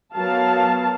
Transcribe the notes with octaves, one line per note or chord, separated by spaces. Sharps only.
F#3 B3 F#4 A#4 F5 A5